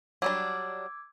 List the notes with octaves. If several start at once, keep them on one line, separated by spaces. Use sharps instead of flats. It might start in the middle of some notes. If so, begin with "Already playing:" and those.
F#3 G3 D4 D6 E6 G#6